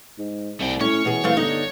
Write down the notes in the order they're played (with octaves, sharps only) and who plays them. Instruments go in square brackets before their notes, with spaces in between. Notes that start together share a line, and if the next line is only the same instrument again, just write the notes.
[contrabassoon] G#2
[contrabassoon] C2 [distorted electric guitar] A3 G5
[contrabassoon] A2 [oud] C#4 [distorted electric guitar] C#5
[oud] B2 G#4 [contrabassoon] E3
[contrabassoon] E3 [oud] A3 C4 F5
[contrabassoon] G1 [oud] D3 D#4